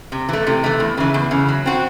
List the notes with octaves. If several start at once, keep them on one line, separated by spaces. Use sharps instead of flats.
C3
E3 A3
C3
E3 A3
E2
C#3 E3
E2
C#3 E3
F#3
C4 F#4